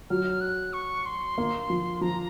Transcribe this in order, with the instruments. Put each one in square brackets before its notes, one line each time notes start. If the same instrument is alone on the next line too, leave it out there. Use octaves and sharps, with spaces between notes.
[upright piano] F#3 [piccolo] F6
[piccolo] F#6
C#6
C6
[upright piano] A#3
F3
[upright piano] F3 [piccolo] A#5